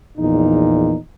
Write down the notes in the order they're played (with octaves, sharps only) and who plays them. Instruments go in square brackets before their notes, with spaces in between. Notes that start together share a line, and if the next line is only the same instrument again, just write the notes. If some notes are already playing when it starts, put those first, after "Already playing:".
[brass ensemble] A#1 E2 A#2 D#4